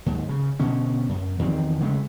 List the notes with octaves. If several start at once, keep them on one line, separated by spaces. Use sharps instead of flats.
D#2 G#2
C#3
B2 D3 C#4
F#2
E2 D#3 F3 C4
C#3 G#3 A3